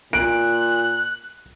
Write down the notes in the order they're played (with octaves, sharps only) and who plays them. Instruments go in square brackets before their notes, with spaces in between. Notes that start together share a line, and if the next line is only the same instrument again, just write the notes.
[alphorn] A#2 [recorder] F#6 [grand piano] D7